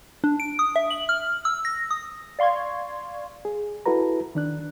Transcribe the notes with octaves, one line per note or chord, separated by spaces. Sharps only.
D4
D7
D#6
E5
F#7
F6
E6
A#6
D#6
D5 F5 C6 C#6 G#6
G#4
E4 F#4 A4 B4 A#5
D#3 D4 F#6